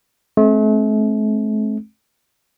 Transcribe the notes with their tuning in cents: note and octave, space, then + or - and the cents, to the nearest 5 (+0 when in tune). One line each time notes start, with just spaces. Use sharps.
A3 -40 C4 +30